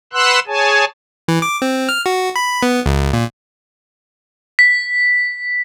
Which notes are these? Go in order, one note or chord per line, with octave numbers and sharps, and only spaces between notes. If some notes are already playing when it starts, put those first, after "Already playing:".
B4 F#5 C6 E6 F#6
G#4 C#5 G#5 A5
E3
D6
C4
F6
F#4
B5
B3
C#2
A#2
B6